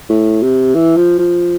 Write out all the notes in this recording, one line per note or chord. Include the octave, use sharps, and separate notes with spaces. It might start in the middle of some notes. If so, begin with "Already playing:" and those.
A2
C3
E3
F3
F3